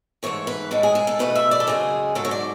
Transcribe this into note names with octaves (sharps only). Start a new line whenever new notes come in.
G#2 E3 A3 C#5
B4
A2 G#3 A4
G#4
G#4
A4
E2 B2 A3 B4
E5
D5
A4
F#2 C#3 G#3 G#4
G#2 F#3 A3 A4
C#5
D5